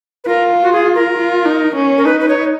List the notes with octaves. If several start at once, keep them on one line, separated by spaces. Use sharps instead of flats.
B4
F4 A#4
F#4
G#4
A#4
F4
D#4
C#4
A#4
D#4 B4
B4
C#5